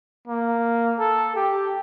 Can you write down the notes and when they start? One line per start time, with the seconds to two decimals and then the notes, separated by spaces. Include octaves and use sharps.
0.28 A#3
0.99 A4
1.35 G4